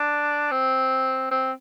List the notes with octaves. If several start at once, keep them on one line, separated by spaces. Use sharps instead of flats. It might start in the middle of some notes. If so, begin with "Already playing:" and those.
Already playing: D4
C4
C4